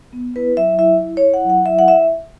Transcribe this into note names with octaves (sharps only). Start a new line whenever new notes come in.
B3
E4 B4
F#3 E5
E4 E5
E4
C#5
E4
F#5
F#3
F#5
E4 E5
F#5
E5